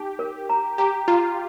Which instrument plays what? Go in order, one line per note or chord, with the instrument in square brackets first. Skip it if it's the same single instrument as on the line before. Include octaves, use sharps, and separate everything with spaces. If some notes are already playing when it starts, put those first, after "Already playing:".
Already playing: [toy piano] D#4 [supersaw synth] G4
[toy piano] A#4
A#5
[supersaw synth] G4 [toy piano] A#5
[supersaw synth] F4 [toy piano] A#5